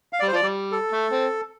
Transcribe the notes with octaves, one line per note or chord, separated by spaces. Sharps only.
F5
D5
G3
C5
F3 D5
G3
A4
A3
C4